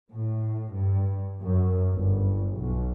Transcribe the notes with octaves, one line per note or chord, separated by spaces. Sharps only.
A2
G2
F#2
G1
B1